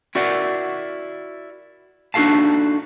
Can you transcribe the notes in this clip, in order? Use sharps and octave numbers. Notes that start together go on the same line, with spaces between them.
E4 F#4 A#4 D5 F#5
D4 D#4 F#4 A4 F5 A5